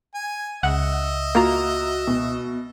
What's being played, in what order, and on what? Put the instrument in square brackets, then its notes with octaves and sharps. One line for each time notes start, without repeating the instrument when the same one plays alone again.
[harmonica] G#5
[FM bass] C#2 [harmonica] D#5 E5 [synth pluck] F#5
[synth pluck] A#3 F4 A#5 [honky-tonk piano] F#4
[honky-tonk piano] B2